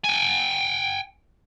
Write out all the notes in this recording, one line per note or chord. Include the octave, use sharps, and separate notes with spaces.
G5 G#5